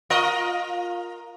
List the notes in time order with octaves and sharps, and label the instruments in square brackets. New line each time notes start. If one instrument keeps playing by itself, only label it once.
[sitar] F4 A#4 D#5